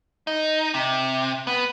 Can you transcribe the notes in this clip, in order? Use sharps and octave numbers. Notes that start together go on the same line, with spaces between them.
D#4
C3
B3